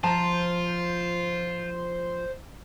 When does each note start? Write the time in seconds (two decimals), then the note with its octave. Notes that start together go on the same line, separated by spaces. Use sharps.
0.04 F3 F4 C5 A5 A#5